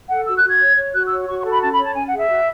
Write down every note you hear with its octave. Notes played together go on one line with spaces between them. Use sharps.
A4 F#5
F#4 E6
F#6
F#4
G#6
C#5
C#5
F#4 F#6
E6
C#5
F#4 C#6
C#6
A4
B5
C#4 A5
B5
C#5
A5
C#4 G#5
F#5
G#4 E5
F#4